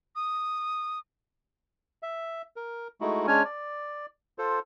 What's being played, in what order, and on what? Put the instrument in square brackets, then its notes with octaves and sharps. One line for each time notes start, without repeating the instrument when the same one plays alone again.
[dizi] D#6
[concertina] E5
A#4
G#3 A3 D#4 E4 F#4
G#3 C#4 D4 C#5 G#5 F6
D5
F4 A4 C5